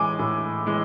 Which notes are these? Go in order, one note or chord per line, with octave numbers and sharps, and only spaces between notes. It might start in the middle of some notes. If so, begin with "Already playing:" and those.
Already playing: A2 E3 G#3 G#5 D6
A2
E3 G#3